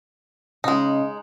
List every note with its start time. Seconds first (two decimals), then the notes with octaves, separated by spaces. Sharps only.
0.64 C#3 G#3 D#4